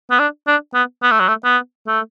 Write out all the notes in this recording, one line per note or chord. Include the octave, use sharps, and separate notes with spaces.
B3
D4
D4
B3
B3
A3
F#3
A3
B3
A3